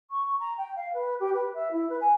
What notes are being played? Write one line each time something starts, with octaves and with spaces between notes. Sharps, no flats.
C#6
A#5
G5
F5
B4
G4
B4
E5
E4
B4
G#5